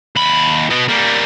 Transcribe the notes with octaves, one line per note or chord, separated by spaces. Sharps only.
D#2 B5
B2 B3
G3 A#3